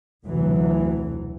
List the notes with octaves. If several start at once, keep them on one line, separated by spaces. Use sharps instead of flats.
F1 D2 B2 E3 F#3